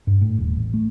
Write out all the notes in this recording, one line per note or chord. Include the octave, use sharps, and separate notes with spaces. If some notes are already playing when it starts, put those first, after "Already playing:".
G2
A2
D#1
A1
A3